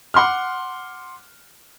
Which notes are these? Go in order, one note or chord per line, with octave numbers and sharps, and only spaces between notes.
F#5 C6 D6 F6